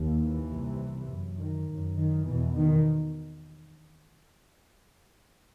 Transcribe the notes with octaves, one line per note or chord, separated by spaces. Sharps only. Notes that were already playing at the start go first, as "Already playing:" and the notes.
Already playing: D#2
E3
C2 C3
F#2
D#3
F#2
D#3
E2 B2 E3
D#3